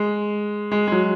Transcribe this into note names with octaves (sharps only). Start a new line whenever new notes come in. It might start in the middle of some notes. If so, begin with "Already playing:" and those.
Already playing: G#3
G#3
G#3
F#3